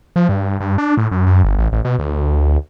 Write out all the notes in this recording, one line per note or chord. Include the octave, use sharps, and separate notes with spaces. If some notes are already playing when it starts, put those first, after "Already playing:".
F3
G2
G2
D4
A2
F#2
F#2
G1
A1
A1
B2
D2